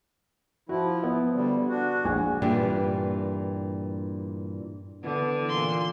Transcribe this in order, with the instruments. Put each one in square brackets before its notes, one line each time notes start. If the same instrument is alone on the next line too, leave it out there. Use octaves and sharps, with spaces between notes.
[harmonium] F3 E4 [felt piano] F#4
[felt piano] B3
[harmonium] D3 G3
D4 F#4
[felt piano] A#1 G#4 G#5
[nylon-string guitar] G2 A#2 E3 D4 G4
[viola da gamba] D3 [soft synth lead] E3 [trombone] B3
[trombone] A#2 [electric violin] C6